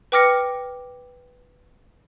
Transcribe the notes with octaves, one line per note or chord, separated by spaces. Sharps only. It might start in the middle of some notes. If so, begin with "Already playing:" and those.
B4 G5 D6 F6 A#6 C#7